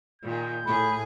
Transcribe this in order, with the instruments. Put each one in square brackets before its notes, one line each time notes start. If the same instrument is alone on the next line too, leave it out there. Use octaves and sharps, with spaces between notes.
[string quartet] A#2 D#3 G#3 [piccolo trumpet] G6
[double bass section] A2 [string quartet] G#4 [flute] B5